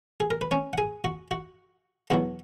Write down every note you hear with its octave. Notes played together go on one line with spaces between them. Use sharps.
G#4
A#4
B4
C#4 C#5
F#5
G#4 G#5
F#4 F#5
F#4 F#5
E2 B2 F#3 F#4 F#5